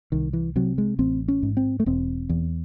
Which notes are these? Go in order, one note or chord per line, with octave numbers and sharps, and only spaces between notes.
C2 D#3
E3
C3 F#3
G#3
A1 C4
C#4
G#2
C4
A3
E1 C4
E2